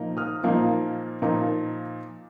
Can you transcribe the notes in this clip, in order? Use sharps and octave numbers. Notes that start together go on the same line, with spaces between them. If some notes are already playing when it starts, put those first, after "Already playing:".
Already playing: A#2 F3 A#3 D#4
D#6 F6
A#2 F3 A#3 D#4
A#2 F3 A#3 D#4